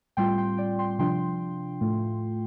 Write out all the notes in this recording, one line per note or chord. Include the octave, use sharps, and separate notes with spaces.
A2 G3 C4 F4 G5 C6
G5 C6
D5 G5
G5 C6
C3 F3 D4 F4 G5 C6
A2 A3 F4